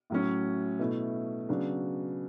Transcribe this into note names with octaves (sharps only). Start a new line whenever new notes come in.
A2 F#3 C#4
B2 A3 E4
C#3 F#3 B3 D4